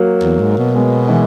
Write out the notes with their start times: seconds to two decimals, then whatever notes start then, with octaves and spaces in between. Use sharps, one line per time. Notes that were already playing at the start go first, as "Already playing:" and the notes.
Already playing: F#3 A#3
0.23 E2
0.40 G#2
0.58 B2
0.74 G#3 B3
1.08 E3 G#3